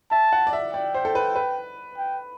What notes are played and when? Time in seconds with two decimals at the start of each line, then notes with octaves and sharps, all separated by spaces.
0.11 E5 A5
0.33 F#5
0.47 D5
0.53 E5
0.73 D5 G5
0.94 C5
1.05 A4
1.15 B4
1.36 B4
1.98 G5